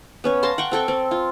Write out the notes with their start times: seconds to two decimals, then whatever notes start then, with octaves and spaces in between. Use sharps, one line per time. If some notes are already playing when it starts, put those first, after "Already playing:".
0.24 B3 C#4 C#5
0.43 F5 A5 A#5 C6
0.58 F#5 G5 C#6
0.71 C4 A4 G5 C#6
0.88 C4
1.11 F4